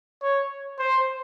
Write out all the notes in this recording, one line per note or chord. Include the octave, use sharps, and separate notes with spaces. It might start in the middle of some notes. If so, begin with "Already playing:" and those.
C#5
C5